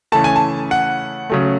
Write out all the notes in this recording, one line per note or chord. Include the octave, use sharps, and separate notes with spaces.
C#3 E3 A3 A5
G#5
A5
F#5
C#3 F#3 A3